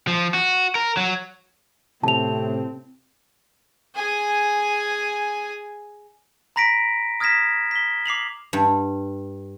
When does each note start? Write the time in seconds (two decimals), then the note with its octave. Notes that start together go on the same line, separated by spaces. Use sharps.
0.08 F3
0.34 F#4
0.75 A#4
0.97 F#3
2.04 A2 C3 C4 A5 F7
3.95 G#4 G#5
6.56 A#5 B5 A#6 B6 D7
7.20 D#6 F6 G#6 A#6 B6 E7
7.71 B6 G7
8.06 D6 C7 F7 F#7
8.53 G2